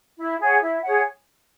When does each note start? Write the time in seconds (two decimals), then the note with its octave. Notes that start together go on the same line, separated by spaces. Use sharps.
0.17 E4
0.39 G#4 C#5 F#5
0.61 E4
0.84 G#4 C#5 F#5